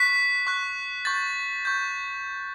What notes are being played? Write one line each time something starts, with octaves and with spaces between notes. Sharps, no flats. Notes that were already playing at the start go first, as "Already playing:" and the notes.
Already playing: C#6 F#6 B6
C#6 F#6
C#6 G6 A6
C#6 G6